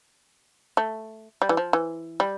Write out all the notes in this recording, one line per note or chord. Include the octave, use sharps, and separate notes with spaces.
A3
G3
E3
F3
E3
G3